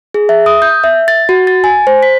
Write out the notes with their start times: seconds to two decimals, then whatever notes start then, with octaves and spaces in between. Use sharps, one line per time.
0.14 G#4
0.29 E5
0.46 D#6
0.62 G6
0.84 E5
1.08 A6
1.29 F#4
1.47 A6
1.64 G#5
1.87 C5
2.03 B6